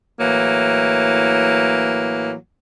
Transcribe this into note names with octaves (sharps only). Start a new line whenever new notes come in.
A2 E3 F#3 A#3